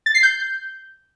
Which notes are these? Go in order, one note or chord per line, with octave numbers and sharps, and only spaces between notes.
A6
C7
G6